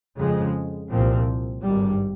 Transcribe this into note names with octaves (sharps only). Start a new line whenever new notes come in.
F2 C#3 G#3
C2 A#2 F3 C4
G#1 G2 G3